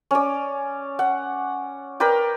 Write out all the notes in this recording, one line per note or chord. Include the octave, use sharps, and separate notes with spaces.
C#4 D5
F#5
A#4 B4 D5 G5